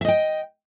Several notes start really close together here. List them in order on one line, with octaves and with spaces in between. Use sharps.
E5 D#5 G5